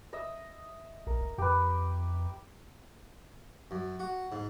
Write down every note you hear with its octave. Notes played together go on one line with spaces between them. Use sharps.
D#5 E5
A#1 A#4
F1
F2 G4 B4
F#2
F#4
G#2